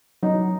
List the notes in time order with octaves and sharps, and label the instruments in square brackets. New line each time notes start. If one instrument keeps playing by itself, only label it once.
[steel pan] F#3 [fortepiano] D#4